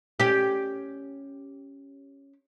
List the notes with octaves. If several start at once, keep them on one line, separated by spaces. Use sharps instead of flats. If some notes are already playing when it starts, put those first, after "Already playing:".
C#4 G4